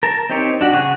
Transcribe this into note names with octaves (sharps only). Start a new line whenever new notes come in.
A#4 A5
C4 D#4 G4 C#5
D4 F#4 G4
C#3 G#4 F#5 C#6 F#6